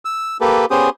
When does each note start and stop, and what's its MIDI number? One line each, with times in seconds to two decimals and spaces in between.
0.05 0.37 88
0.41 0.66 58
0.41 0.66 67
0.41 0.66 69
0.41 0.66 71
0.71 0.90 59
0.71 0.90 61
0.71 0.90 67
0.71 0.90 68
0.71 0.90 72
0.71 0.90 87